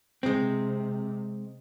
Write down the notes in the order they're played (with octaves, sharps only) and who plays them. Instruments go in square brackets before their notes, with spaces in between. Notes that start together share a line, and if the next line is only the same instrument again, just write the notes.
[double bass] C3 [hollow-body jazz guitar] G#3 C4